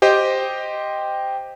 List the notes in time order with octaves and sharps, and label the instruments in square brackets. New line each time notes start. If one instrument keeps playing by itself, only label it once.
[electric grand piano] G4 C5 D#5 G5